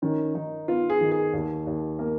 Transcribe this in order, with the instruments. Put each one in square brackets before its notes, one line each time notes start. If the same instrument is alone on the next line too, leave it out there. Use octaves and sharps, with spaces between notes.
[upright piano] D#3 [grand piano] C#4
[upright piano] D#3 [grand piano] D#4
[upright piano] B3 [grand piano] F4
[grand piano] G#4
[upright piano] D#3
[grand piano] G#4
[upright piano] D#2
D#2
A#3